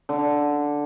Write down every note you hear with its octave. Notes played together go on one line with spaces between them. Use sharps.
D3